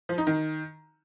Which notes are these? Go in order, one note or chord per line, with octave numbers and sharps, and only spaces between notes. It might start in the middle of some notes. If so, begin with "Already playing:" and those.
F3
D#4
D#3